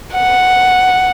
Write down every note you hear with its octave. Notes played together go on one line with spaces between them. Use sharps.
F#5